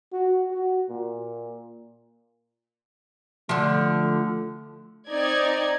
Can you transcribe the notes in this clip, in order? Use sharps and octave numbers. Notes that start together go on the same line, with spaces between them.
F#4
F#4
A#2
D3 F3 A3
C4 D#4 D5 G#6